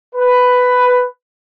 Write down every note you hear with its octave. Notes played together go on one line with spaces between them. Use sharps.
B4